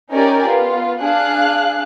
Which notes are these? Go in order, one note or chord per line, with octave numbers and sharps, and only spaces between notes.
C#4 D#4 G4 A#4 D5 G#5
B3 F4
D4 G#4 F5 F#6